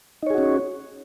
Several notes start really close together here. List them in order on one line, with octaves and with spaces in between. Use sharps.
D#4 C#5 G#4 F#4 C#4